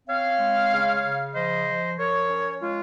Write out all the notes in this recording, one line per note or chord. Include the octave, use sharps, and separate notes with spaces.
C4 C#5 F5
G#3
C#3
C#3
F3 C5 D#5
F3
F3 A#4 C#5
C#4
G#3 F4